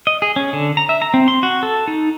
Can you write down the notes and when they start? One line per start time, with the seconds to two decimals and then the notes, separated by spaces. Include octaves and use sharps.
0.07 D#5
0.22 G#4
0.36 C#4
0.53 D3
0.77 A#5
0.89 E5
1.02 A#5
1.14 C4
1.28 C6
1.43 F#4
1.63 A4
1.88 D#4